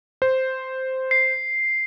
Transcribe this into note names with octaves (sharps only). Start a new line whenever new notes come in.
C5
C7